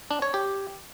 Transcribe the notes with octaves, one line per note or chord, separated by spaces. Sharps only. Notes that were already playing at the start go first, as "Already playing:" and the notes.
D4
C#5
G4